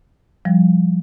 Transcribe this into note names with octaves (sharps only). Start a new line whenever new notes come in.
F3 G3